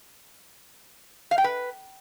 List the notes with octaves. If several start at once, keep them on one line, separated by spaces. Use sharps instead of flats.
F5
G5
B4